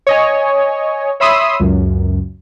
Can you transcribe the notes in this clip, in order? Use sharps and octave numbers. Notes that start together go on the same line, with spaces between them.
C#5 D#5 G#5
C#5 E5 B5 C6 D#6 E6
C#2 F#2